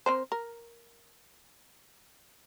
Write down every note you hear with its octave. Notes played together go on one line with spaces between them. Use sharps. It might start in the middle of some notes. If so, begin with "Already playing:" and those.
C4 A#4 C5
A#4